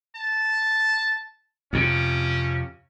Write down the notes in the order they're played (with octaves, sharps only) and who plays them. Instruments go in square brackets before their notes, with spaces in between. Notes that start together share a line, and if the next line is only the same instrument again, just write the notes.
[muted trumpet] A5
[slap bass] F2 C3 [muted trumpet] C#4